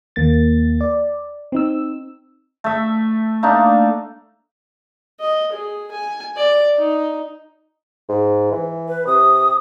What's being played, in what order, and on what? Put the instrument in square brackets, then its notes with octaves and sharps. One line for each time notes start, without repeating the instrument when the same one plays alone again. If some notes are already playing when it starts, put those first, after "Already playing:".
[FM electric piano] D#2 A#3 A6
D5
C4 D#4 E6
[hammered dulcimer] A3 E5
A3 A#3 D4 D#4
[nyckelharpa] D#5
G#4
G#5
D5
D#4
[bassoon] G#2
E3
[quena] B4
[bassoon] C3 [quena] D#6